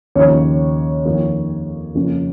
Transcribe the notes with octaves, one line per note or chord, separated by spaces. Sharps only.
D#2 C#3 F3 A#3 C#5
F2 D#3 A#3
F2 C#3 A#3